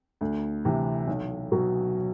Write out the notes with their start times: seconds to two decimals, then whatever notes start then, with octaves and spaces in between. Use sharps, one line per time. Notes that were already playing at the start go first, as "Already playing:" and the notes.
0.21 D2
0.65 C3 E3
1.07 B1
1.52 B2 F#3